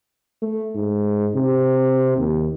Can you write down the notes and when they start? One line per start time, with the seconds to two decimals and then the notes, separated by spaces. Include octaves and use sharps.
0.42 A3
0.75 G#2
1.35 C3
2.18 D#2